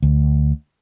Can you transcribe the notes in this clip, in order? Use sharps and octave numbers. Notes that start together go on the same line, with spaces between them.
D2